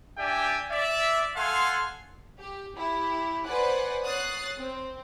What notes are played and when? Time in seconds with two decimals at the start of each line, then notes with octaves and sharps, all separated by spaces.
0.18 D4 G4 D5 E5 G5 G#5
0.71 D5 E5
1.37 A4 F5 F#5 G#5 C6
2.40 G4
2.76 E4 G4
3.45 B4 C5 D5 F#5 G#5 F#6
4.05 C#5 D#6 F#6 A6 C7
4.57 C4